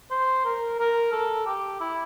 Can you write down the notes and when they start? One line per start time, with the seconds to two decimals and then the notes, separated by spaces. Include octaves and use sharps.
0.11 C5
0.45 A#4
0.80 A#4
1.12 A4
1.46 G4
1.81 E4